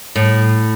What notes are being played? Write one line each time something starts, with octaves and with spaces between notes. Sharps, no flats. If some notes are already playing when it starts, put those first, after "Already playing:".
A2